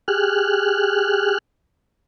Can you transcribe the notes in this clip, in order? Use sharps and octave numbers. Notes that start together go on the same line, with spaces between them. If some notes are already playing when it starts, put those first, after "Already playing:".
G4 G#4 F6 F#6